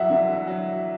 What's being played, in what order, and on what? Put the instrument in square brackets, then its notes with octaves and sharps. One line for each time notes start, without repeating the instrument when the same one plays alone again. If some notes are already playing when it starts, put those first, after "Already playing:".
Already playing: [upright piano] E2 F#3 [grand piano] E5 F#5
[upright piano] D3
F#3